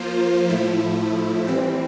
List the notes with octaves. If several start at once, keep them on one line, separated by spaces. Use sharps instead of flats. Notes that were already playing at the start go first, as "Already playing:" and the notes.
Already playing: F3 A#3 F4 C5
A2 F3 A3 E4
E3 G3 C4